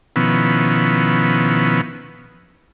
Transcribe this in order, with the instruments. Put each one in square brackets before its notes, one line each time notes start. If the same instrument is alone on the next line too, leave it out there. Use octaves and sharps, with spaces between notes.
[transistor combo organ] B2 D#3 F3 B3 C#4 E4